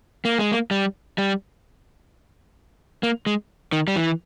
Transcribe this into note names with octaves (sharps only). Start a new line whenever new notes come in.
A#3
G#3
A#3
G3
G3
A#3
G#3
D#3
G3
E3